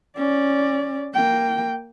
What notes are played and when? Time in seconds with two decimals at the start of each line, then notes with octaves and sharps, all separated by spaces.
0.17 C#4 D5
1.14 A#3 G5